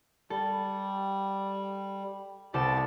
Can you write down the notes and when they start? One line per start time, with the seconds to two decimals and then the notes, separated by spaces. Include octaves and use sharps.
0.30 G3 A4
2.54 C2 B3 G4 A4 D5 E7